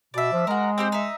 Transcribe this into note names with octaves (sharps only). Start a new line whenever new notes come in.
B2 D5 E5
F3
G#3 F#4 A#4
C4 G4 C5
D#4 E5